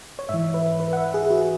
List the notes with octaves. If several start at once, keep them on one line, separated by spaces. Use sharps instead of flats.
C#5
G#2 E3 E5
B4
B4
F#5
E5
G#4
F#4